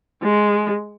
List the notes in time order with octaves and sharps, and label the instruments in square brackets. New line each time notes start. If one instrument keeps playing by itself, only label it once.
[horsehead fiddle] G#3